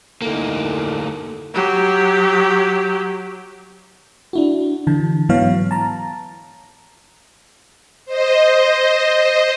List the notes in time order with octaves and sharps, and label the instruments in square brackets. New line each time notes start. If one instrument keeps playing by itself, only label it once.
[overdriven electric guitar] D2 A#3 [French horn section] D#4 E4 A4
[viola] F#3 G4
[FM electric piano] D4 E4 F#4
D3 E3 A5
G#2 E3 F#3 B3 C#5 F5
A5 A#5
[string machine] C5 D#5